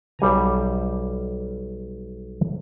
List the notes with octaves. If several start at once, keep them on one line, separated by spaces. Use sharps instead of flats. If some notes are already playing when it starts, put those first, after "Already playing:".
B1 G3 G#5 A#5